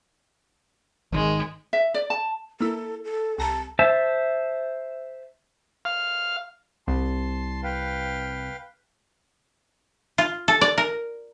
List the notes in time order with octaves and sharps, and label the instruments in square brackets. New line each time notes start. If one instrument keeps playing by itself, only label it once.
[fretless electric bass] G#1 D#3 [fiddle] G#3
[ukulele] E5
D5
A5
[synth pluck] A#3 E4 [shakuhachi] A4
[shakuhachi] A4
[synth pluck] C2 A#5 [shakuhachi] A5
[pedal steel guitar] C5 E5 A5
[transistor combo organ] F5
[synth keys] C2 [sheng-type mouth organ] A5 C6
[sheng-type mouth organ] B4 F5 G5
[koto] F4
A4
D5
A#4